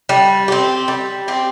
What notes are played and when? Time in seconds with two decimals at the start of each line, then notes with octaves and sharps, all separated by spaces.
0.09 G3
0.48 C4 G4
0.88 G3
1.28 C4 G4